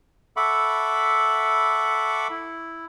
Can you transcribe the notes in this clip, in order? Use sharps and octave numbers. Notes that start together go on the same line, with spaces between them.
A4 E5 F#5 B5 C#6 D6
E4